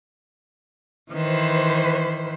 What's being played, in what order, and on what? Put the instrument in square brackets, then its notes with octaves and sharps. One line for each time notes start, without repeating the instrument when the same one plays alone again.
[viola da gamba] D#3 E3 [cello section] B4 C5